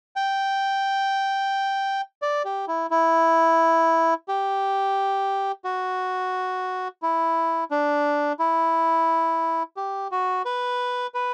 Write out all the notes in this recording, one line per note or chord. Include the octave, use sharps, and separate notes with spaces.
G5
D5
G4
E4
E4
G4
F#4
E4
D4
E4
G4
F#4
B4
B4